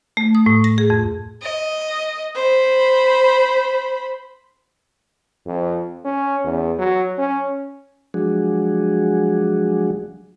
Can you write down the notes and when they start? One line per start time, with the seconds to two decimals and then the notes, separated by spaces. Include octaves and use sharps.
0.17 A3
0.35 D#6
0.46 A2
0.64 A#6
0.78 G#4
0.90 F2
1.42 D#5
2.35 C5 B5
5.46 F2
6.05 C#4
6.44 E2
6.78 F#3
7.18 C#4
8.14 F3 F#3 G#3 D4 F#4 G#4